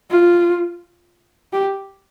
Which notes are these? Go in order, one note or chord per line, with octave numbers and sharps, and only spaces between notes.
F4
G4